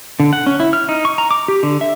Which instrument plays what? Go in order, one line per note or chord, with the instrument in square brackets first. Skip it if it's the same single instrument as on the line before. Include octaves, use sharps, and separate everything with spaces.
[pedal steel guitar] D3
F#5
C#4
E4
F6
D#4
C#6
A#5
D6
G4
D3
E5